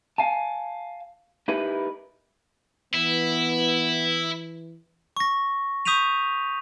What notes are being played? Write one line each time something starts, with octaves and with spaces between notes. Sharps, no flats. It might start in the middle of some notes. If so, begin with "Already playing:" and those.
F5 G#5 A5
D#4 E4 G4 A#4 B4
E3 B3 E4
C#6 A#6
C#6 D#6 G6 B6 D#7 F7